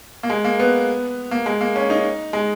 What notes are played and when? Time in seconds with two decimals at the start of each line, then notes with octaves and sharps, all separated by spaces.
0.23 A#3
0.30 G#3
0.45 A#3
0.60 B3
1.31 A#3
1.46 G#3
1.61 A#3
1.76 C#4
1.90 D#4
2.33 G#3